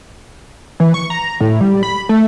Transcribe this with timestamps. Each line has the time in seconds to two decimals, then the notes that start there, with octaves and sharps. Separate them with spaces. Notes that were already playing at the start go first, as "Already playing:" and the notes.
0.80 E3
0.94 C#6
1.10 A#5
1.41 A2
1.61 G3
1.83 B5
2.09 A3